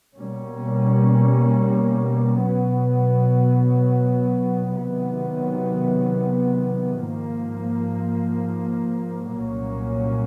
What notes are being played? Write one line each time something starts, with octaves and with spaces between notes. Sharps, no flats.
B2 G3 A#3 C#4
B2 F#3 B3
C3 D#3 F#3 B3
G#2 F3 A#3
C2 A#2 F#3 A#3 C#4